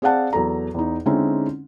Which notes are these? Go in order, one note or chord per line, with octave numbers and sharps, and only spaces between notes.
C4 G#4 D5 F5 F#5 A5
E2 F#3 A4 A#5
E2 D#4
D3 G#3 C4 C#4 D#4 E4